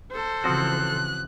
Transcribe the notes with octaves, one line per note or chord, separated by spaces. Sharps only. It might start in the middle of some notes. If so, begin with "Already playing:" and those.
A4 C5
C#3 E3 F3 C4 F#4 F#6